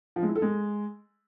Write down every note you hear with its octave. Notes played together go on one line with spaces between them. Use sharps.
F3
G#3
E4
A4
G#3